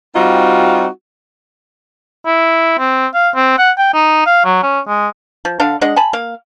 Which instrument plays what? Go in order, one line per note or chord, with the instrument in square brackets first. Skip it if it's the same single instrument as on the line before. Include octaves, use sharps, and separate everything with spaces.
[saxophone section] G3 C4 D#4 F4 F#4
[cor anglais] E4
C4
F5
C4
F#5
G5
D#4
F5
F#3
C#4
G#3
[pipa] F3
D3 D4 F5
G#3 D4 D#5 F#5
G#5 A5 B5
A#3 F5